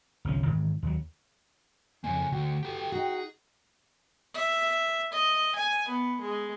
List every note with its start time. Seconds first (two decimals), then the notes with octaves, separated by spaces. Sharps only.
0.25 G1 C2 F3 C#4
0.44 G#2 C3 D#3 E3
0.83 D#2 F#3
2.04 F2 C#3 A#3 G#5
2.32 D2 F#4 G5
2.63 G4 A4
2.92 D#4 F#4 G#4
4.34 E5
5.13 D#5
5.56 G#5
5.88 B3
6.21 G#3